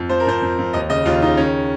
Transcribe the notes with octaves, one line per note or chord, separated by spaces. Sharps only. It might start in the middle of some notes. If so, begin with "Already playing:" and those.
Already playing: F2
F3 C5
A#4
F2 C5
F2
F2
D#2 D#5
C#3 D#5
D#2 F4
C#3 D#4
D#3 C#4